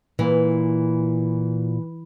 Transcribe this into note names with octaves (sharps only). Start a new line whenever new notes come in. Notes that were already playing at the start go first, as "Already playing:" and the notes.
A#2 E3